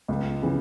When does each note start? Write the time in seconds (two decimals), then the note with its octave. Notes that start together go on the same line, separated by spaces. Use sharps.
0.08 C#2
0.43 C#3 E3